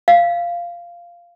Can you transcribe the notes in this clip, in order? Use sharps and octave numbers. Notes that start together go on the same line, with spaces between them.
F5